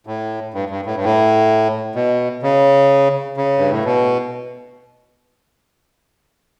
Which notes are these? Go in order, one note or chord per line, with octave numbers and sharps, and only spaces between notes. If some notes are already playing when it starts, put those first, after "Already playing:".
A2
G2
G2
A2
G2
A2
B2
C#3
C#3
G2
A2
B2